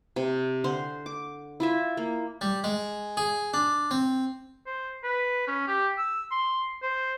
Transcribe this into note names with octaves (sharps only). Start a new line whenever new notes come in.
C3
D3 C5 C6
D6
E4 F4 E5
A#3
G3
G#3
G#4
D4
C4
C5
B4
C#4
G4
E6
C6
C5